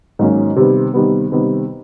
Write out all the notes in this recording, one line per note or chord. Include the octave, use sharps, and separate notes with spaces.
G#2 D#3 F#3 A#3 C#4
C3 D#3 G3 B3
C3 D#3 G3 B3
C3 D#3 G3 B3